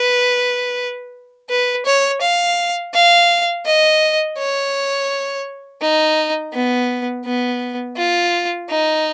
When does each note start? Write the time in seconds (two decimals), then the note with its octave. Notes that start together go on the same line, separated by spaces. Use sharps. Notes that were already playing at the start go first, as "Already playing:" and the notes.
Already playing: B4
1.50 B4
1.86 C#5
2.21 F5
2.94 F5
3.65 D#5
4.37 C#5
5.81 D#4
6.53 B3
7.25 B3
7.97 F4
8.69 D#4